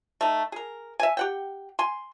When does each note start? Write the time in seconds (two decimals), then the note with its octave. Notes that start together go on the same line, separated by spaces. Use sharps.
0.21 A3 D#4
0.52 G#4 A#4
1.00 E5 G#5
1.17 G4 F#5 G5
1.79 G#5 C6